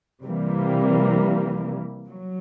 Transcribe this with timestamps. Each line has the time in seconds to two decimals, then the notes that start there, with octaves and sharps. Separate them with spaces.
0.24 C3 E3 G3 A#3
2.10 F#3